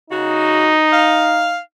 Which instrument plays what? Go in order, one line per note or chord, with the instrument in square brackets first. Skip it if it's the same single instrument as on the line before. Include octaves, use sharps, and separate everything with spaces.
[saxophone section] C#3 F#4 [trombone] D#4
[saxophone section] F5